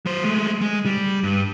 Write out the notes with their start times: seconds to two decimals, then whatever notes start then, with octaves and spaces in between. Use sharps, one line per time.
0.06 F#3 C5
0.24 G#3 A3
0.61 G#3
0.85 G3
1.23 G2